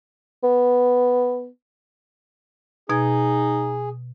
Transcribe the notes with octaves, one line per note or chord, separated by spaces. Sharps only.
B3
B2 D#4 G#4 G#6